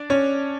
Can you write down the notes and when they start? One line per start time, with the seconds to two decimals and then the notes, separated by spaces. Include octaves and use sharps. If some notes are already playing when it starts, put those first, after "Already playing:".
Already playing: D4 D5
0.10 C#4 C#5